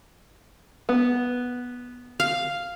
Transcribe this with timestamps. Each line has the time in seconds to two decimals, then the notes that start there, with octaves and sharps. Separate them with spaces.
0.89 B3
2.20 F5